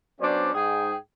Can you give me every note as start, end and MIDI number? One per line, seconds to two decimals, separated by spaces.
0.21 0.50 54
0.21 0.50 59
0.21 0.50 61
0.21 0.50 62
0.21 0.50 72
0.21 0.50 74
0.54 0.95 44
0.54 0.95 68
0.54 0.95 79